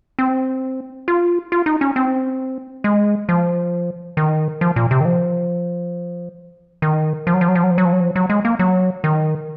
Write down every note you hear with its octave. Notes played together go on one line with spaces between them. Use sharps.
C4
F4
F4
D#4
C#4
C4
G#3
F3
D#3
F3
A#2
C3
D#3
F3
D#3
F3
F#3
F3
F#3
F3
F#3
F3
F#3
F3
F#3
F3
F#3
G#3
A#3
F#3
D#3